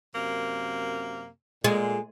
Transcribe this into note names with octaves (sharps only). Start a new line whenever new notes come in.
F#2 C3 A#3
A#2 G#3